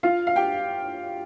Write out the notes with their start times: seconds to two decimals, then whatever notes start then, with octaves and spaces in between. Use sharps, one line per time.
0.03 F4 F5
0.27 F5
0.36 G4 G5